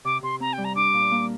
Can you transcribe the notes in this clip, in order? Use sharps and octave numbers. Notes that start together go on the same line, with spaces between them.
C3 D6
C3 C6
C4 A#5
G5
G3
A#5
D4 D6
A#2
A#3